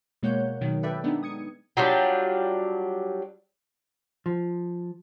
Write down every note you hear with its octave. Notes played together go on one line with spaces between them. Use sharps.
B2 G#3 A#3 C#5 F#5 G6
B2 D#3 F#3
A4 B4 D5 E5 G5
G#3 B3 D4 D#4
D#6 G#6 C#7
F#3 G3 D4 F4
F3